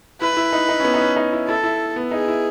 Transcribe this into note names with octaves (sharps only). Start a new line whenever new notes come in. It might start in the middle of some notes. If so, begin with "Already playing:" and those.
E4 B4
E4
D#4
D#4
C#4
B3
D#4
C#4
D#4
E4
E4 A4
E4
B3
D#4 G#4
E4